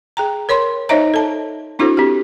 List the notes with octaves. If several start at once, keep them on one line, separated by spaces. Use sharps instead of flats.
G#4 G5 A#5
A#4 C#5 B5 C6
D#4 C5 C#5 D#5 E5 A#5
A4 A5
C4 D4 E4 F#4 A4 C5
C4 G4